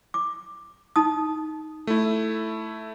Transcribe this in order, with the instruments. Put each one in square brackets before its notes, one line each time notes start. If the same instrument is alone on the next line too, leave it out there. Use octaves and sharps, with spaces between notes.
[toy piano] D6
D#4 A5 D#6
[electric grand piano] A3 E4